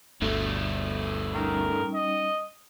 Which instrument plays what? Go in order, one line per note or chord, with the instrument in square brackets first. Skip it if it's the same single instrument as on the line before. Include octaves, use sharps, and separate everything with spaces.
[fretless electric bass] G1 D2 [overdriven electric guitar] G2 A3
[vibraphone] G3 C#4 D#4 [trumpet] A#4
[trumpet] D#5